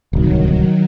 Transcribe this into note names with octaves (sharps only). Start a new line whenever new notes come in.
D1 C2 D#3 F#3